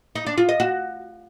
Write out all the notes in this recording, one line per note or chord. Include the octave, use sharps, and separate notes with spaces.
D#4
D4
F4
D#5
F#4